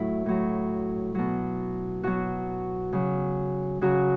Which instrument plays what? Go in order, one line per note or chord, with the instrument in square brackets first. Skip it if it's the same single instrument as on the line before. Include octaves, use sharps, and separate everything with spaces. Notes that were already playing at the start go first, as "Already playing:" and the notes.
Already playing: [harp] A2 F#3 E4
A2 F#3
B2 F#3
B2 F#3 F#4
C#3 F#3
C#3 F#3 F#4